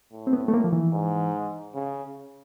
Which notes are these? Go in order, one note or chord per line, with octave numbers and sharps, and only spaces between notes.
A2
C4
B3
A3
A#3
F3
E3
G#2
C#3